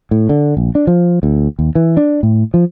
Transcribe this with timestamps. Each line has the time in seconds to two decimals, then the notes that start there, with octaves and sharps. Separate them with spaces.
0.11 A2
0.29 D3
0.57 A#1
0.75 D4
0.87 F3
1.23 D2
1.59 D#2
1.75 E3
1.97 D4
2.23 A2
2.54 F3